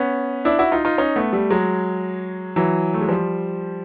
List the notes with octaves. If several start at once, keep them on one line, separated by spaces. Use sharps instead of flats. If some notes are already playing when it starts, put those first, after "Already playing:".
Already playing: B3 C#4
D4 E4
E4 F#4
D#4 F4
D#4 F4
C#4 D#4
A3 B3
G3 A3
F#3 G#3
E3 F#3
A3
G#3
F3 G3